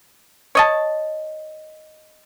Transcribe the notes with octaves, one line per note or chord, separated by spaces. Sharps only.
C#5 D#5 A5